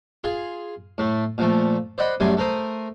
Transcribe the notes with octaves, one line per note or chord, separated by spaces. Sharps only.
F4 G#4 C6
A2 A3
A#2 F3 A3
C5 D5 D#5 F#5 B5
F#2 G3 A3 G#5 C6 D6
A3 A#4 C5 D#6